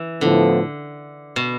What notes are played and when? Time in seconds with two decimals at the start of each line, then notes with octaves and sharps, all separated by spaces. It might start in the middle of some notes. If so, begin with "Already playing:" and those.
Already playing: E3
0.21 A2 D3 F3 B3 E4 A4
1.36 B2